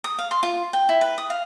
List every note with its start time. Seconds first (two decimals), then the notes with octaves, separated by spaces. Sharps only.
0.04 D#6
0.19 F5
0.31 C6
0.43 F4
0.73 G5
0.89 E4
1.01 B4
1.18 D#6
1.30 F5